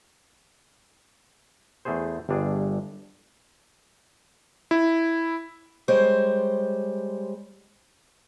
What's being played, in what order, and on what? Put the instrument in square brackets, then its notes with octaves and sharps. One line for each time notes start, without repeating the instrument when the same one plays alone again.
[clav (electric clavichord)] E2 A3 B3 G#4 C5
G1 G2 D4 G#4
[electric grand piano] E4
[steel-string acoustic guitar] G3 G#3 C5 C#5